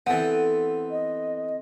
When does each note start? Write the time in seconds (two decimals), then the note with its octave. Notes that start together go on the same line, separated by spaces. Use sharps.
0.07 E3 B3 C4 A4 F#5
0.91 D#5